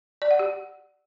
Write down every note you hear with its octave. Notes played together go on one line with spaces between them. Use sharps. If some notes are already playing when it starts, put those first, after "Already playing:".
D5
F#5
G4